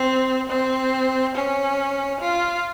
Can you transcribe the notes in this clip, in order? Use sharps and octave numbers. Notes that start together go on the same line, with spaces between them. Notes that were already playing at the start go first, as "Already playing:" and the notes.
Already playing: C4
C4
C#4
F4